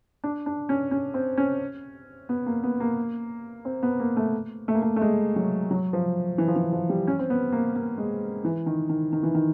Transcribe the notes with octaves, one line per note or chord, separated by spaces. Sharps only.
D4
D4
C#4
C#4
C4
C#4
B3
A#3
B3
A#3
C4
B3
A#3
A3
A3
A#3
A3
A3
G#3
F#3
F#3
F3
E3
F3
E3
F3
G3
C#4
C4
B3
A#3
A#3
G#3
E3
D#3
D#3
D#3
E3
D#3